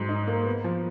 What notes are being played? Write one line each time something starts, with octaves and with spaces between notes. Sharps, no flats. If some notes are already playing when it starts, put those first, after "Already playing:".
Already playing: G#2 F#3
D#4
A#3
B3
F3